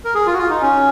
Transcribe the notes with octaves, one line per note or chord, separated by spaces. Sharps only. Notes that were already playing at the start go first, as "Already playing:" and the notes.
A#4
G#4
F4
F#4
F4
D#4
C#4